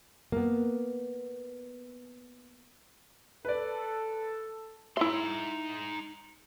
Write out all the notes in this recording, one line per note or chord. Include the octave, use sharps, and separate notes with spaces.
A#3 B3
A4 B4 D5
D#4 E4 E5 C6